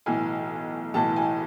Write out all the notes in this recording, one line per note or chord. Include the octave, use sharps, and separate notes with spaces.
B1 A2 E3 G#5
B1 A2 E3 A5
G#5